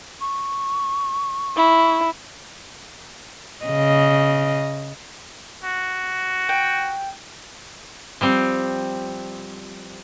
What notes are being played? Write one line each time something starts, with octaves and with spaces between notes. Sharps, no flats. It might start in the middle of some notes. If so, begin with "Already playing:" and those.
C#6
E4
C#3 D#5
F#4
G5
F3 G3 C4